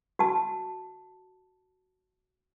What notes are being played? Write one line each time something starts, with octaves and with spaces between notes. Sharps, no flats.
F#4 A5